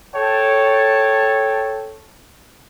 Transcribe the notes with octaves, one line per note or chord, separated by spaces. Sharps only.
A4 C#5 G5 A5